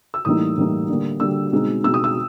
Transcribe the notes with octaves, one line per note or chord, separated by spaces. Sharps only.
E6
A2 E3 G3 A#3 D#4 D#6
A2 E3 G3 A#3 D#4
D3 G3 A#3
D3 G3 A#3 E6
B2 G#3 C4 D#4
B2 G#3 C4 D#4 E6
D#6
E6